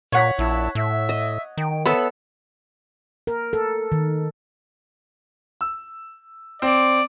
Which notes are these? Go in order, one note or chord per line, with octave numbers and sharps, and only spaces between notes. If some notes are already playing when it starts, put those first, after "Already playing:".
A#2 C#5 F#5 B6
A#1 E4 A5 E6
A2 E5 E6
D#5
D#3 G5
B3 A4 C#5 E5 B5 E6
A#4
A4
D#3
E6
C4 D5